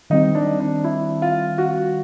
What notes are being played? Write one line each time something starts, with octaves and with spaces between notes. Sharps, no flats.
D#3 G3 C4 D#4
D4
D4
E4
F4
F#4